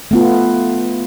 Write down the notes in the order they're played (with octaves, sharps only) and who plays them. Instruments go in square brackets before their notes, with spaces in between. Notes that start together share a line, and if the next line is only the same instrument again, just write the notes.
[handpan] A3 B3 F4